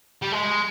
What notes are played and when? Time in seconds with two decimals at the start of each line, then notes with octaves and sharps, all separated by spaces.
0.22 G3
0.32 G#3